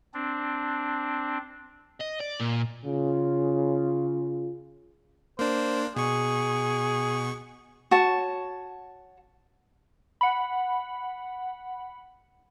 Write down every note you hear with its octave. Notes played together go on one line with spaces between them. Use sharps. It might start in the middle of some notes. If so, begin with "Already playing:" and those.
C4 D4
D#5
D5
A#2
C#3 F4
A#3 D4 C5
B2 G#4 C#6
F#4 C#5 A5
F#5 B5